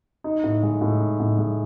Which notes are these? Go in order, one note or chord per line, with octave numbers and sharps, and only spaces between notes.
D#4
A2
G#3
A2
D#4
A2
G#3